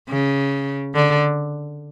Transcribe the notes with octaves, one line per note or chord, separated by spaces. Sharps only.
C#3
D3